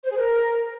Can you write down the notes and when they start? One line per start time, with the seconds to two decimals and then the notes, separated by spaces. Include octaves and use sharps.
0.04 C5
0.10 G#4
0.16 A#4